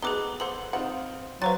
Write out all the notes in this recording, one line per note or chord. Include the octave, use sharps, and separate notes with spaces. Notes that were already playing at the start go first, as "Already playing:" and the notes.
F#3 A3 B3 D#4 G#4 D6 F#6 G7
A4 C5 F#5 C6 F#7
C4 D#4 F4 F#5
F#3 F#4 B4 C5 F5 C6 A6